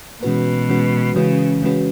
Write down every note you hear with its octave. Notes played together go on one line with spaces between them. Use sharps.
B2 E3 G#3 C#4 F#4 B4
E3 G#3 C#4 F#4 B4
C#3 E3 G#3 C#4 F#4 B4
E3 G#3 C#4 F#4 B4